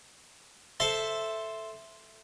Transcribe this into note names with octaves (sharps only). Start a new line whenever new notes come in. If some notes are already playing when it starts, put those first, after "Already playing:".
A4 C5 E5 A5